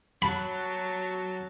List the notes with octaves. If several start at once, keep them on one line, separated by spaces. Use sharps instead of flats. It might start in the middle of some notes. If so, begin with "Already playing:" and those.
F#3 A5 B5